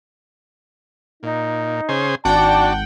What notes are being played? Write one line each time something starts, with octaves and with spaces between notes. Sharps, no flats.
A#2 D#4
C#3 G#4 C5
G#1 D4 F#4 D5 F#5 G5 A5